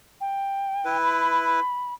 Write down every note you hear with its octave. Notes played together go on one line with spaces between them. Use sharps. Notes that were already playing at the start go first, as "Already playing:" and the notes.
G5
E4 B4
B5